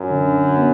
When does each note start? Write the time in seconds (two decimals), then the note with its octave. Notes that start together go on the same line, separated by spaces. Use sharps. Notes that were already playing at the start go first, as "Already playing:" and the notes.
Already playing: F#2
0.10 D3 D4
0.57 B3